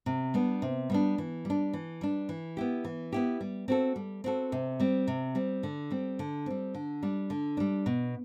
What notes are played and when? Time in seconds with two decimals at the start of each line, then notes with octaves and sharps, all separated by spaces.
0.06 C3
0.34 G3 B3 D4
0.62 C3
0.90 G3 B3 D4
1.18 E3
1.45 G3 D4
1.73 E3
2.01 G3 D4
2.29 E3
2.57 B3 E4 G4
2.85 E3
3.13 B3 E4 G4
3.41 G3
3.68 C4 F#4 A4
3.96 G3
4.24 C4 F#4 A4
4.52 C3
4.80 G3 C4
5.08 C3
5.35 G3 C4
5.63 D3
5.90 G3 C4
6.19 D3
6.46 G3 C4
6.74 D3
7.03 G3 D4
7.30 D3
7.57 G3 D4
7.86 B2